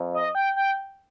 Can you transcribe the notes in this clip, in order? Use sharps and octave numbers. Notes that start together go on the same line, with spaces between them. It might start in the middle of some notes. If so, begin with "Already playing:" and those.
Already playing: F2
D#5
G5
G5